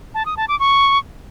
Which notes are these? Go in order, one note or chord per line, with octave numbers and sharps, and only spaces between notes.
A5
D#6
A5
D6
C#6